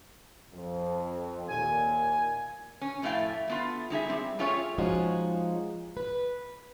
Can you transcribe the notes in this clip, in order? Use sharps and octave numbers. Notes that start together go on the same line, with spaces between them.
F2
D#2 A#2 G#5
C#4
F2 A2 A3 C4 F5 G5
A3 B3 F4
G3 D#4 G#4 E5
G3 C4
A3 C#4 F4 G#4 C#5 F5
F3 G#3 C#4 D#4 F4 F#4
B4